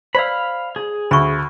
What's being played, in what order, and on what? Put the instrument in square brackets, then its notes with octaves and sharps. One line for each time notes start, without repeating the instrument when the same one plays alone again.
[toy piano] C5 D5 E6 [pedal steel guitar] F5 B5
[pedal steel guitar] G#4
[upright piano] D2 [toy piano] B5 C#6